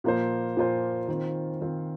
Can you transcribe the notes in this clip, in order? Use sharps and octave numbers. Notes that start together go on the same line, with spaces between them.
A#2 F3 A#3 F4 C5
A#2 F3 A#3 F4 C5
D#3 C4 F4
D#3 C4 F4